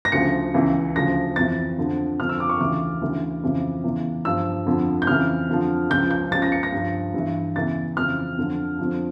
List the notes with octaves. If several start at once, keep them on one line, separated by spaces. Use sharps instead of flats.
A#6
D2 C#3 F3 C#7
C#2 C#3 E3
D2 C#3 F3 A#6
F2 E3 A6
F2 D3 F3
F2 D3 F3 F6
E6
D6
C#6
D2 C#3 E3 D6
D2 C#3 E3
F2 C#3 E3
E2 C#3 E3
G2 F3 E6
F2 D3 F3
G6
F2 C#3 E3 F6
F2 D3 F3
C#2 C#3 F3 G6
G6
C#2 C#3 F3 A6
A#6
C#7
A#6
G2
F3
G2 E3
E2 C#3 E3 A6
F2 C#3 E3 F6
F2 D3 F3
F2 D3 F3